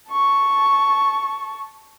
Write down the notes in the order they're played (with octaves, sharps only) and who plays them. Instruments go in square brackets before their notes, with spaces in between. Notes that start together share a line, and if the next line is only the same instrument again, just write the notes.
[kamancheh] A5 C#6